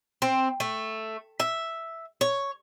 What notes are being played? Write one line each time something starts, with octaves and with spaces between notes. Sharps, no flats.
C4
A3
E5
C#5